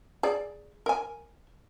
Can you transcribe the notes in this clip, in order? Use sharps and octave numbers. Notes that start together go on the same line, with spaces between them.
G#4 D5
A#4 G#5